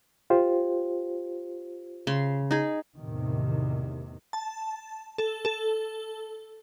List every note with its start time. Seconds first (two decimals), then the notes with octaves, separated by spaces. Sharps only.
0.30 F4 G4 C5
2.07 C#3 C6
2.51 D#4 G#4
2.98 E2 A2 C3 D#3
4.33 A5
5.18 A4
5.45 A4